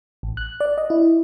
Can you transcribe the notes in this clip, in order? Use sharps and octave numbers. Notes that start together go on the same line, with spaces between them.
A1
F#6
D5
D#5
E4